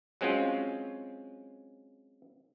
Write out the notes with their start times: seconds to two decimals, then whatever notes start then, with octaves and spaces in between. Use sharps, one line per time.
0.21 F#3 G#3 C4 C#4 F4